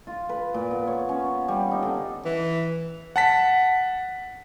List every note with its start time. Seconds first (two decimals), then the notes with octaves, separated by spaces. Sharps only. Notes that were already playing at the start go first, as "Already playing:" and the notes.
0.07 F4
0.29 B4
0.54 A#2
0.71 B3
0.88 C#5
1.09 C#4
1.48 G3
1.71 D#4
1.83 D3
2.25 E3
3.16 F#5 A5 B6